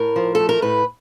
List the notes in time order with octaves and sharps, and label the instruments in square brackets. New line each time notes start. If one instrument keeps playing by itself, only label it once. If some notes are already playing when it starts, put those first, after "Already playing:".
Already playing: [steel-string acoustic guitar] A2 A#4
F3
A3 A4
A#4
A2 B4